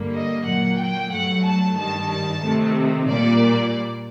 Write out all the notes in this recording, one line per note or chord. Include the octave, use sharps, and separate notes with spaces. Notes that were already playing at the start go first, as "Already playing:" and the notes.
Already playing: G2 D3 G3 A#3
D#5
A#2 F#3 A#3 F#5
G5
G2 F#3 A3 F#5
A5
G2 D#3 G3 A5
A5
C3 D#3 A3
A#2 G3 A#3 D5